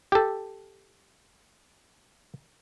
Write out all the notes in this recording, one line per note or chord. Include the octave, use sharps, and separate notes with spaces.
G4 A4